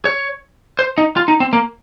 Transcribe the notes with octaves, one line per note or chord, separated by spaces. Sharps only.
C#5
C5
D#4
F4
D#4
C4
A#3